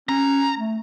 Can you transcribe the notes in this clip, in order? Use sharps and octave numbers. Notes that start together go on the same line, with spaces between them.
C#4 A#5
A3